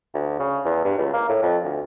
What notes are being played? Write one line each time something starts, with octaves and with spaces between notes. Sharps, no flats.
D2
C#3
E2
G2
C#2
A#3
A2
F2
D2